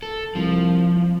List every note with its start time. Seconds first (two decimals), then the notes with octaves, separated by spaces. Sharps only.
0.03 A4
0.35 C2 F3